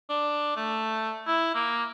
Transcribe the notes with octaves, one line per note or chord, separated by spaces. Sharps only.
D4
A3
E4
A#3